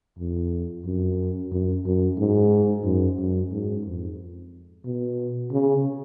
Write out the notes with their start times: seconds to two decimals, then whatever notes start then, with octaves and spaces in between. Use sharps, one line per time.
0.19 F2
0.85 F#2
1.52 F#2
1.85 F#2
2.18 G#2
2.84 F#2
3.19 F#2
3.52 G#2
3.85 F2
4.85 B2
5.51 C#3